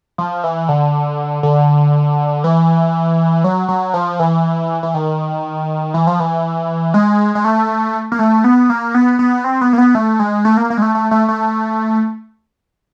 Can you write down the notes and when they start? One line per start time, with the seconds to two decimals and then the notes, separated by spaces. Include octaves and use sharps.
0.18 F3
0.44 E3
0.69 D3
1.43 D3
2.44 E3
3.44 F#3
3.68 F#3
3.94 F3
4.20 E3
4.83 E3
4.94 D#3
5.94 E3
6.07 F3
6.20 E3
6.94 G#3
7.35 G#3
7.45 A3
8.12 A#3
8.19 A3
8.44 B3
8.70 A#3
8.94 B3
9.19 B3
9.44 C4
9.61 B3
9.73 A#3
9.78 B3
9.95 A3
10.19 G#3
10.45 A3
10.57 A#3
10.70 A#3
10.77 G#3
10.82 A3
10.95 A3
11.11 A3
11.28 A3